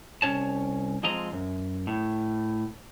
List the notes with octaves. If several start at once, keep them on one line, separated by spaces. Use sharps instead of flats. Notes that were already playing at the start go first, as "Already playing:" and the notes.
C2 C#4 C#5 A5
F3 G#3 C4 D#5 A#5
F#2
A2